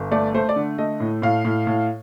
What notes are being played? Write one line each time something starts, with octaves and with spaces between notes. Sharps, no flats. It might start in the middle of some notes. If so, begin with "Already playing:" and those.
Already playing: G1
A3 D5
A3 C5
D5
D3
A3 D#5
A2
A2 F5
A2
A2